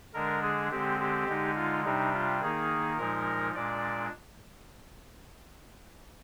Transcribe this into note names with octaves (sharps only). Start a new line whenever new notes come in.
D3 G#3 D4 A#4
G#4
D3 G#3 C4 G4
G4
D3 G#3 D#4
F4
C3 G3 D4 D#4
F4
D#3 A#3 D#4 G#4
A#2 F3 G#3 D#4 A#4
A#2 G#3 D4 D5